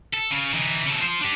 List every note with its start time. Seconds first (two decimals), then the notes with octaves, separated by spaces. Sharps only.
0.13 A4
0.31 C#3
0.53 E3 D#4
0.86 C#3 A4
1.01 F4 C5
1.21 D4 G4